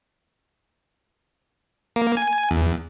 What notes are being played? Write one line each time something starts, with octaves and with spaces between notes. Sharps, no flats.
A#3
G#5
E2